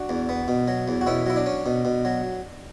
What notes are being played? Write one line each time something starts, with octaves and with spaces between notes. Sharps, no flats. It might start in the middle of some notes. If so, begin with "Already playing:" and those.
Already playing: D4 F#4
E2
B3
B2
F#3
E2
F#4
B2 C#4 E4
F#3 E4
D4
C#4
B2
B2
F#3